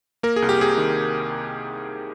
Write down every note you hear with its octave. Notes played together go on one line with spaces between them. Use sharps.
A#3 A#4
G#4
C2
G4
C3 G#4
D#3